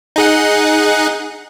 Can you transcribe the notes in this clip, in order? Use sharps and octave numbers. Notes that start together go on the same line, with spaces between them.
D#4 G#4 F#5